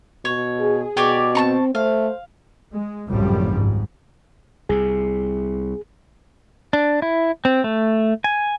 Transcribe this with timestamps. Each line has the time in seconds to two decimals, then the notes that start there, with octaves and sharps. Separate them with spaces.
0.25 B2 C#5
0.60 G#4
0.97 B2 G4 C#5 D5
1.35 C4 A5 A#5 C#6
1.75 A3 C5 F5
2.73 G#3
3.09 G#1 C#2 F#2 A2 F3 G3
3.54 G#2
4.69 C2 C3 G#4
6.73 D4
7.02 E4
7.45 C4
7.64 A3
8.24 G#5